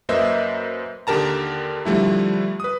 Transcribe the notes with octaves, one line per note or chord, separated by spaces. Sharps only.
F#2 A#3 B4 C5 D#5 E5
D#2 D3 G4 A#4 A5 A#5
D3 F3 G3 A3 E4
B4 D#6